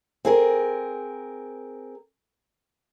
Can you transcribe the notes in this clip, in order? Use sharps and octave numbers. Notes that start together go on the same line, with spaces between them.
C4 G#4 A#4